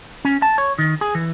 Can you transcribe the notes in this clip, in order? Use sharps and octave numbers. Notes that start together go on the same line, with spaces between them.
C#4
A5
C#5
D#3
G#4
E3